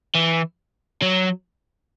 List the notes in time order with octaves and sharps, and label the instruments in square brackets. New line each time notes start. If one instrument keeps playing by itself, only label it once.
[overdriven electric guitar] E3
F#3